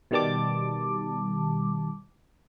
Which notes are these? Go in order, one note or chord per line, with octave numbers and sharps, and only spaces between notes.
B2 D#3 G3 A5 D6